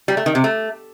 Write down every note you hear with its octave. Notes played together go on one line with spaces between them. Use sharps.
G3
A3
D#3
C3
A3